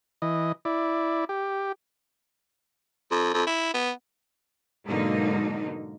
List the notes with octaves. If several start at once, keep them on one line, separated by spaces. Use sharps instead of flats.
E3 D#5
E4 D5
G4
F2
F2
E4
B3
G#2 B2 D3 F#3 A#3 D#4